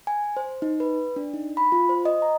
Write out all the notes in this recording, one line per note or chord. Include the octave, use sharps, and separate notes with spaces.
G#5
C5
D#4
B4
D4
D#4
B5
F4
C5
D#5
A#5